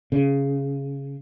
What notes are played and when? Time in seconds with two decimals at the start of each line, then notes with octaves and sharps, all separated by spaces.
0.12 C#3